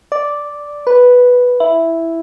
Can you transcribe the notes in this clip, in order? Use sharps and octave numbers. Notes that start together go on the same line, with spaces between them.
D5
B4
E4